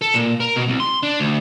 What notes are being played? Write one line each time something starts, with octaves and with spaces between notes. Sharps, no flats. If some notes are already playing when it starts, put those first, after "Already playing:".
A4
A#2
A#4
B2
C2
C6
D4
D2